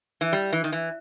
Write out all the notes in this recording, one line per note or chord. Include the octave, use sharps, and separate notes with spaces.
E3
G3
E3
D#3
E3